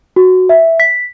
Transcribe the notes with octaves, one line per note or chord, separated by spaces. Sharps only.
F#4
E5
B6